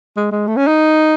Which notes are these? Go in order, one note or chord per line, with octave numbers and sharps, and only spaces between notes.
G#3
G#3
A3
C#4
D#4